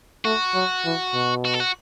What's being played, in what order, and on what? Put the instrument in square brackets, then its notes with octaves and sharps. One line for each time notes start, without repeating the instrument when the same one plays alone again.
[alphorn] A3 [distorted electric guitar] F#4
[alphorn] F#3
E3
B2
[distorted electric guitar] F#4
A4
F#4